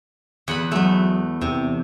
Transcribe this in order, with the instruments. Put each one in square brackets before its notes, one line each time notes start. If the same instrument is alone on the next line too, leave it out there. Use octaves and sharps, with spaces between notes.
[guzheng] E2 F#5 B5
[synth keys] F#3 G#3 [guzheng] A3 B3
[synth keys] E2 [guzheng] C3